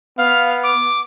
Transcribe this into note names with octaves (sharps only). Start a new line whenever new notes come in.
B3 F5
D6